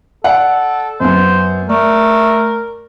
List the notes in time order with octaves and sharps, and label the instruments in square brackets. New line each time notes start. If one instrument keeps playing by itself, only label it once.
[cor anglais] A4 [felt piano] D5 F#5
[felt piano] F#2 B3 [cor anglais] C5
[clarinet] A3 [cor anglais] A#4 [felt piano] D5